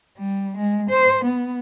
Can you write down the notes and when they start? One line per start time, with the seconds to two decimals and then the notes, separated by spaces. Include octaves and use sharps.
0.18 G3
0.57 G#3
0.90 C5
1.24 B3